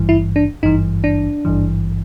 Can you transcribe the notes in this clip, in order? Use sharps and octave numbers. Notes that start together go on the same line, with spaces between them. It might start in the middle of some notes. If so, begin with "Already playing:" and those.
Already playing: G#1 G2 E3
E4
D4
G#1 G2 E3 D#4
D4
G#1 G2 E3